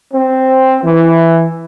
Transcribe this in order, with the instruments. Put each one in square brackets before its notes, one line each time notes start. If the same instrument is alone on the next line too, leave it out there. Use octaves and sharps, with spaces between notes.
[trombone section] C4
E3